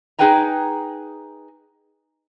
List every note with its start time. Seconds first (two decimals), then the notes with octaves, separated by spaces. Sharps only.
0.19 D#4 G#4 B4 G5 G#5 A#5